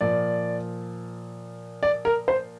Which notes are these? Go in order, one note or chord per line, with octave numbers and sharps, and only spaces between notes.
A#2 F3 D5
D5
A#4
C5